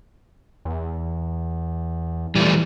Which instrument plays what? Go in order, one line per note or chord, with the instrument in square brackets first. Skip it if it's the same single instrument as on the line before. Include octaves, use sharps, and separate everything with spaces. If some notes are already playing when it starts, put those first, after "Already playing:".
[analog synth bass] E2
[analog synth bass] A#2 [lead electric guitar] E3 F3 [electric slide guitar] G3 A3